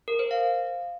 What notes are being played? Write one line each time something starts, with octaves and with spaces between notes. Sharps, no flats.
A#4
C5
F5